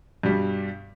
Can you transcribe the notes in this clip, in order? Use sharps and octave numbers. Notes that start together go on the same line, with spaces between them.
G2 B2 G3